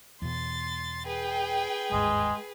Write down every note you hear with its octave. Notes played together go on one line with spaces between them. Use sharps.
E2 B2 C6 A6
G#4 B4 G5
G1 D#2 G#2 G#3